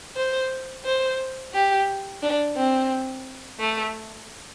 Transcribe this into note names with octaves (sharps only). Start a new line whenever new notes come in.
C5
C5
G4
D4
C4
A3